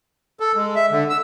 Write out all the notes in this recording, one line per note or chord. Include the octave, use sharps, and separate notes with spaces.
A4
G#3
E5
D3
E6